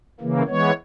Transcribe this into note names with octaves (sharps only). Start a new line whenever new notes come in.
C#3 E3 A#3
E3 G#3 B3 C#5